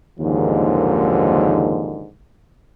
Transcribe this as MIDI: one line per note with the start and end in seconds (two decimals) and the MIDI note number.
0.20 2.08 30
0.20 2.08 39
0.20 2.08 44
0.20 2.08 50
0.20 2.08 51
0.20 2.08 53